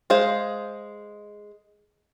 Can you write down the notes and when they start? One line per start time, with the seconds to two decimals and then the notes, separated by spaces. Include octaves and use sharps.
0.10 G#3 G#4 C5 F5